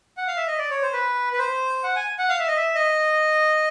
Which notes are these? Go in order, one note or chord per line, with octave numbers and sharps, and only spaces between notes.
F#5
F5
E5
D#5
D5
C#5
C5
B4
B4
C5
F#5
G#5
F#5
F5
E5
D#5
E5
D#5